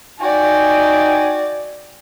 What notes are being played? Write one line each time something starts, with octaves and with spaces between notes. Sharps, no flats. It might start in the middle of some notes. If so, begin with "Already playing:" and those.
D#4 F#4 D5 G5 G#5